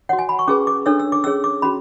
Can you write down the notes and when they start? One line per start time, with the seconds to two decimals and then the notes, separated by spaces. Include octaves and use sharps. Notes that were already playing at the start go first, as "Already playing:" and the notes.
0.09 F#4 C#5 F#5
0.19 G#5
0.29 B5
0.39 C#6
0.48 C#4 G#4 B4 D6
0.67 D6
0.86 D4 A4 C#5 E6
0.99 E6
1.12 D6
1.24 C#4 G#4 C#5 E6
1.44 D6
1.62 C#4 F#4 B5